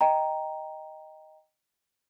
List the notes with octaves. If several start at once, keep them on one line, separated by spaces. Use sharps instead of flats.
D#5 G5 A#5